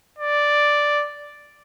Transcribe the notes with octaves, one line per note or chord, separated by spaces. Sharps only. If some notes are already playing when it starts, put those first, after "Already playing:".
D5